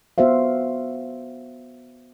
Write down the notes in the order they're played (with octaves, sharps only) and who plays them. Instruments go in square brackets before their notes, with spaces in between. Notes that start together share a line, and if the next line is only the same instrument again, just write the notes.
[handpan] B3 F#4 C5 E5 F5